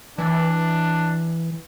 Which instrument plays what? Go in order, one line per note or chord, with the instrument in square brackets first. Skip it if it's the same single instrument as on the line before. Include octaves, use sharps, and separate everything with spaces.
[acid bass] E3 [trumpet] D4